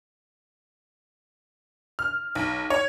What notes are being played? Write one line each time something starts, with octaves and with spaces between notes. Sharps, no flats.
F6
B1
C#5